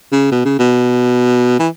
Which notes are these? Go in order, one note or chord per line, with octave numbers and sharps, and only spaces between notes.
C#3
B2
C#3
B2
E3